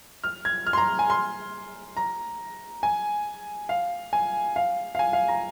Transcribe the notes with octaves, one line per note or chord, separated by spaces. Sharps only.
F6
G#6
F6
C6
A#5
G#5
C6
A#5
G#5
F5
G#5
F5
F5
G#5
F5
A#5